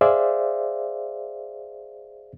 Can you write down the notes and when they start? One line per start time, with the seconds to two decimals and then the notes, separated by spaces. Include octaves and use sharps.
0.01 G#4 C5 D5 E5 F5